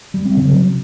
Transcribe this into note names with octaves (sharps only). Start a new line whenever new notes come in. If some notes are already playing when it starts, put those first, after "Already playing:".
G3
C4
C#3
F#3